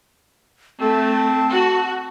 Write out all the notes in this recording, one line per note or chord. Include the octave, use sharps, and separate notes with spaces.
A3 C4 A5
F#4